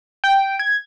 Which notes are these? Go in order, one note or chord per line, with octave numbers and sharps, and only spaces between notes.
G5
G#6